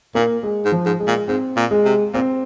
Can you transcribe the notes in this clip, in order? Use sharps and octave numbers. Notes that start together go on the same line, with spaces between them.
A#2 A#3
G#3
G#2
F3
G#2
G#3
A#2
G#2 C4
A#2
G#3
C3
A#2 C4